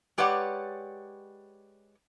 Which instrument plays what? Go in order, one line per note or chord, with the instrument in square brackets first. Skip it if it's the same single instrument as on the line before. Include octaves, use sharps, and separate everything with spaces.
[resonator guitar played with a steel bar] G#3 G4 B4 C#5 D5 F#5